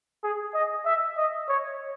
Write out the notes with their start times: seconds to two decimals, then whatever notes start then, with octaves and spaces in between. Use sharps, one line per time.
0.23 G#4
0.54 D#5
0.85 E5
1.17 D#5
1.48 C#5